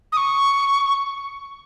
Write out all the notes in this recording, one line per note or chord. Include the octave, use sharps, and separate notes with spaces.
D#6
C#6